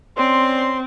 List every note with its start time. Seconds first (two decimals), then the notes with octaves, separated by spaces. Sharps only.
0.17 C4 C#4 D5 C6